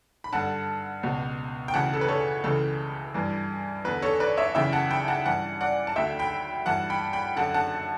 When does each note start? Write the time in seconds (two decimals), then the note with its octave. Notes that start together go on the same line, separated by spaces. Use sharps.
0.24 B5
0.33 G2 D3 F#5 A5
1.03 C#2 B2
1.68 G5
1.74 D2 C#3 E3 F#5 A5
1.93 A4
2.01 B4
2.08 A4 C#5
2.44 C#2 C#3 E3 A4
3.14 G2 E3
3.84 E2 D3 B4
4.02 A4 C#5
4.20 B4 D5
4.37 C#5 E5
4.55 F#2 C#3 E3 E5 G5
4.73 F#5 A5
4.91 G5 B5
5.08 F#5 A5
5.26 G2 E3 F#5 A5
5.61 D5 F#5
5.87 A5
5.96 D2 D3 E5 G5
6.19 G5 B5
6.66 G2 E3 F#5 A5
6.90 G5 B5
7.13 G5 B5
7.36 F#2 D3 F#5 A5
7.54 F#5 A5